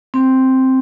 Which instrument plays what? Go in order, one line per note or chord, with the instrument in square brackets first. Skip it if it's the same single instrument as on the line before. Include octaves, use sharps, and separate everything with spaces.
[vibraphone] C4